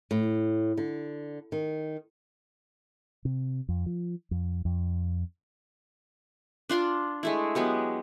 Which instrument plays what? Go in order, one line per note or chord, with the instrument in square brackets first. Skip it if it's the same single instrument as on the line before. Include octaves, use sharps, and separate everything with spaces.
[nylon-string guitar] A2
D3
D#3
[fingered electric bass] C3
F2
F3
F2
F2
[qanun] D4 F4 C6 D6
G#3 A3 E4
F#3 G#3 B3 G4